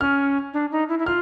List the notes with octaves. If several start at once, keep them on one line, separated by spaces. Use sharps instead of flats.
C#4 F6
D4
D#4
E4
E4
F4 F6